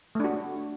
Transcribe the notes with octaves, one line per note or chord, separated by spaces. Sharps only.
A3 D4 F#4